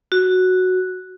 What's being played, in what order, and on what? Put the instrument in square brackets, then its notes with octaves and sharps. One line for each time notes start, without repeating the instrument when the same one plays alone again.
[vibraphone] F#4